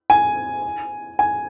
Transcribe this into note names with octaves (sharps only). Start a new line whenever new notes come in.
G#5
G#5